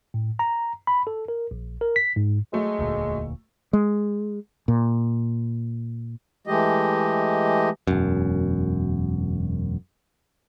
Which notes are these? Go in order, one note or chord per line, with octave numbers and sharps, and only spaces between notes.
A2
A#5
B5
A4
A#4
A#1
A#4
B6
G#2
F#3 G#3 A3
E1 D2 A#2
G#3
A#2
E3 G#3 A3 G4 D#5
E1 F#2